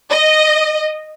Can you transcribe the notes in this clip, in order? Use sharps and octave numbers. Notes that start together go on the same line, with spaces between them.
D#5